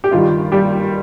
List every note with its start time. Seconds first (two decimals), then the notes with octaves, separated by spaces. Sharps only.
0.04 G4
0.11 G2 D#3 G3 F4
0.52 G3 G4